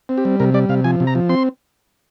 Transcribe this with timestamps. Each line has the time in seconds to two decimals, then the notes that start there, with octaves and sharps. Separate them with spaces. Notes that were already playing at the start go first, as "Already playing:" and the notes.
0.09 C4
0.18 G4
0.25 G3
0.40 C3 A#4
0.54 G3 D5
0.69 C3 F5
0.84 F3 G#5
1.00 C3
1.07 A#5
1.15 F3
1.29 C4 C6